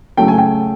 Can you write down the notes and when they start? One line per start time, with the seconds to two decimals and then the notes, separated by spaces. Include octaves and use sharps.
0.17 C#3 F#3 A3 G5
0.28 G#5
0.38 G5